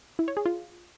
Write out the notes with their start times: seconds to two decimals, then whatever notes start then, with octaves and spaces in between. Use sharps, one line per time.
0.19 E4
0.28 C#5
0.37 G#4
0.46 F4